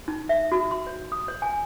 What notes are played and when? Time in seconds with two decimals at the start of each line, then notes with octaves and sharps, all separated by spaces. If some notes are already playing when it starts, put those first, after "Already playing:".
0.08 D#4
0.29 E5
0.52 F#4
0.71 C6
0.87 C#5
1.12 D#6
1.28 C#5
1.42 G#5